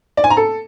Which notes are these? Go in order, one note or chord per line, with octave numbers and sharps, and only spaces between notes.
D5
G#5
A#5
A4